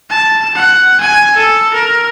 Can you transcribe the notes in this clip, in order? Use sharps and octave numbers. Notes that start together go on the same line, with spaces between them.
A5
F#5
G#5
A4
A#4